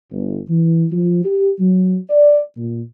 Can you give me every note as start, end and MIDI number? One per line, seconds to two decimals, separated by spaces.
0.11 0.39 31
0.49 0.85 52
0.92 1.21 53
1.25 1.49 67
1.59 1.98 54
2.10 2.40 74
2.57 2.81 46